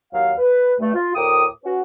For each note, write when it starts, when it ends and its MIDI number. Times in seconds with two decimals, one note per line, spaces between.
0.13 0.33 39
0.13 0.33 54
0.13 0.33 77
0.38 0.74 71
0.80 0.92 43
0.80 0.92 57
0.95 1.12 65
1.15 1.45 38
1.15 1.45 45
1.15 1.45 70
1.15 1.45 79
1.15 1.45 86
1.15 1.45 87
1.64 1.82 61
1.64 1.82 66
1.64 1.82 71